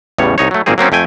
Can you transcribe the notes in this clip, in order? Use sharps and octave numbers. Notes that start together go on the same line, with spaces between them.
A1 E2 A2 C#3 G3 C#5
C2 D#4 C#5
F#3 A3
G#1 A#2 A#3 C4 G#4
F#3 A#3 C4 C#4
F2 A3 G5 G#5